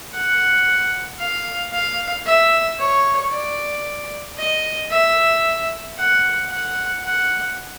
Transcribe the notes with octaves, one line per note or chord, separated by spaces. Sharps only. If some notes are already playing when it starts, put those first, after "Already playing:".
F#5
F5
F5
E5
C#5
D5
D#5
E5
F#5
F#5
F#5